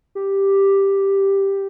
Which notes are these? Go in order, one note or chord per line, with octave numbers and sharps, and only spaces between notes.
G4